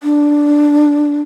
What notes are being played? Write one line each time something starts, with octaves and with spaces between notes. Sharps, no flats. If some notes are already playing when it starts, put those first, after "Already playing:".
D4